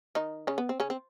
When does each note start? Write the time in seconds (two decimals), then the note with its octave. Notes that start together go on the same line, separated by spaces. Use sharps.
0.15 D#3 D#4
0.47 C#3 C#4
0.58 B3
0.69 C4
0.80 C#3 C#4
0.90 C4